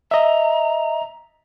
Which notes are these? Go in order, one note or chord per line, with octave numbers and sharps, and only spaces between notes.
D#5 E5 A#5